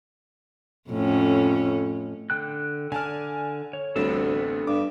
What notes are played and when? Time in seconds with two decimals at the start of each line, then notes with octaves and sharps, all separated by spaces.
0.90 F2 A2 C#4
2.30 D3 G5 F#6
2.92 D3 D5 G#5 A5 F6
3.73 C#5
3.96 A1 D2 G3 B3 C4 D4 A4
4.67 G2 D6